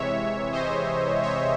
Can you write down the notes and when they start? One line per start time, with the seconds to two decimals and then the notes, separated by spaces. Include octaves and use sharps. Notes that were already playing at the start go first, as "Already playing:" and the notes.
Already playing: C3 E3 G#3 C#5 E5
0.52 C5 D#5
1.22 C#5 E5